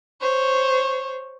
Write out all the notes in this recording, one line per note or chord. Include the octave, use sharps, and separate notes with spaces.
C5 C#5